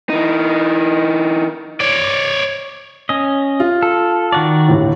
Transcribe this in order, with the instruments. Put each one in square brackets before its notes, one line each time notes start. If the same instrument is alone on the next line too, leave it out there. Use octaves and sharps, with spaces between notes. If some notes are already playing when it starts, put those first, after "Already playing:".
[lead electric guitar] E3 D#4
[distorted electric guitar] C#5 D5
[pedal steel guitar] C#4 D#5
[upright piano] F4
[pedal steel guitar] A4
D#3 F#4 D5
[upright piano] G1 D#2 A2